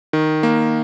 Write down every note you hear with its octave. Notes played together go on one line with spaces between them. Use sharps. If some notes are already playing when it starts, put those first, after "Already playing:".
D#3
A#3